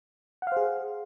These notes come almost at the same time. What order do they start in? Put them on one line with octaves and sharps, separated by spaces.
F#5 F5 C5 G#4